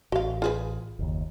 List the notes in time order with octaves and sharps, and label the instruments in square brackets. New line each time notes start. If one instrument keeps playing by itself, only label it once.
[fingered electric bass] A1 [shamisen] F#4 F5
[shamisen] F4 G#4 B4
[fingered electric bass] F#1 D#2